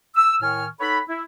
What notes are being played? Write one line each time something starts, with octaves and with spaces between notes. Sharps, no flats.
E6
A2 D#3 G#5 C#6 F6
D#4 A4 C#5 F#5 B5
E4